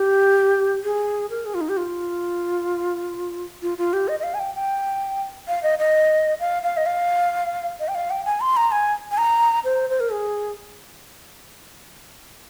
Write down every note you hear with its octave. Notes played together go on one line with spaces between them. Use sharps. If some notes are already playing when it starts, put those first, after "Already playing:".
Already playing: G4
G#4
A#4
G#4
F4
D#4
G4
F4
F4
F4
G4
D#5
D#5
F5
G#5
G5
G5
F5
D#5
D#5
F5
F5
D#5
F5
D#5
G5
F5
G5
G#5
C6
A#5
G#5
G#5
A#5
C5
C5
A#4
G#4